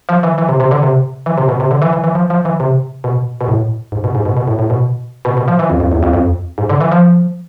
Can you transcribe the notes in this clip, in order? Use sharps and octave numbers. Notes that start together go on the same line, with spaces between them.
F3
E3
E3
C3
C3
D3
C3
E3
C3
B2
C3
D3
E3
E3
E3
F3
F3
E3
C3
B2
B2
A2
G#2
B2
G#2
B2
B2
A2
A2
B2
B2
B2
F3
E3
F2
F2
E2
F2
F2
G#2
D3
E3
F3